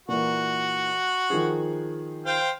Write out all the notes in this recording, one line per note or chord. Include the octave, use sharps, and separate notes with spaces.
A#2 E3 A#3 F#4
D#3 F3 G#4
C5 F5 G5